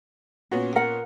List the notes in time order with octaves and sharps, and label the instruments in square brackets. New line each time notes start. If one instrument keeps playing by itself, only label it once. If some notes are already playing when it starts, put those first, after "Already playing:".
[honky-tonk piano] A#2 B3 C#4 [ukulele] F#4
[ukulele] A#4 F#5